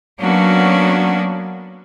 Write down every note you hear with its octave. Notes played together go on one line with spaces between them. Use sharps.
F#3 A#3 B3 C#4 D4 F#4